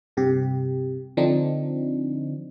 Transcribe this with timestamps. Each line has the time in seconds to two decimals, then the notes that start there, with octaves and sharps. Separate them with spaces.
0.17 G2 C3 G4
1.17 D3 F3 C4 D4 D#4